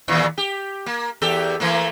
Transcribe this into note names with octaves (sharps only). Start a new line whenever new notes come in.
D#2 A#2 E3
G4
A#3
E2 G4 A4
E3 A3 A#3